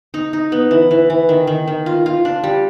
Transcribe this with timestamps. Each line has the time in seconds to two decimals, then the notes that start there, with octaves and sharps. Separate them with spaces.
0.14 D#4
0.33 D#4
0.52 B3
0.71 E3
0.91 E3
1.10 E3
1.29 D#3
1.47 D#3
1.67 D#3
1.86 F4
2.06 F4
2.25 D4
2.44 G3